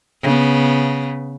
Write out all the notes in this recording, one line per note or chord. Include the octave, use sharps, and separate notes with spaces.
C#3 B3